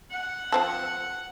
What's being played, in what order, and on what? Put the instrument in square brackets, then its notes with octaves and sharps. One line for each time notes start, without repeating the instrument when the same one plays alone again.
[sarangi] F#5
[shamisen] F3 C4 A4